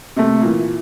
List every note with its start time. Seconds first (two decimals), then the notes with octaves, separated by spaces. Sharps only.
0.17 C3 A3
0.41 A#2 E3